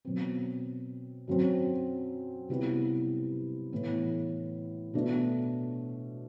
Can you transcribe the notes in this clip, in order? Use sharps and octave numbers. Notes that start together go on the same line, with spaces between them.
B2 F#3 C4
F#2 F#3 C4
C3 G3 B3 E4
A2 E3 B3
B2 A3 D4